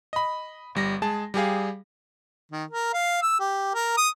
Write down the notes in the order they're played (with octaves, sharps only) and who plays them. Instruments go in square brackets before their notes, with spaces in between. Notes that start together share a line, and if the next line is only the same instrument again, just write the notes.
[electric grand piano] D#5 B5
G1 G3 A#6
G#3 G#4 A5
G3 G4 G#4 F5
[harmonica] D#3
A#4
F5
E6
G4
A#4
D#6